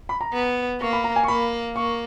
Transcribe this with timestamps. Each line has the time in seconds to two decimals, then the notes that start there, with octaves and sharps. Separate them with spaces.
0.09 B5
0.21 A#5
0.33 B3
0.81 A#3 C#6
0.93 B5
1.04 A#5
1.16 G#5
1.24 C#6
1.28 A#3 B5
1.76 A#3 C#6